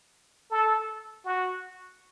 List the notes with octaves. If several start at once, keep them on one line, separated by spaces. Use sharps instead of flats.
A4
F#4